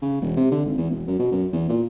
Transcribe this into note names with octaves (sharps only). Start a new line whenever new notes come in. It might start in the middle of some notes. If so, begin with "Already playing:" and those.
C#3
E1
C3
D3
G#1
E2
E1
F#2
B2
F#2
E2
A#2